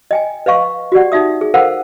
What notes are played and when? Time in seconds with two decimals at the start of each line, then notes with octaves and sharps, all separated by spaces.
0.11 D#5 G5 G#5
0.46 B4 D#5 F5 C#6
0.92 F#4 G4 D5 F#5
1.12 D#4 F#4 E5 D#6
1.41 G#4
1.54 A4 A#4 C5 F5 F#5